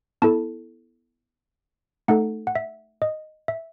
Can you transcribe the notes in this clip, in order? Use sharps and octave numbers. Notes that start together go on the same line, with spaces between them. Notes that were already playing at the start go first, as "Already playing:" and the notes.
B3 E4 A4 A5
A3 D#4 A4 F#5
F#5
E5
D#5
E5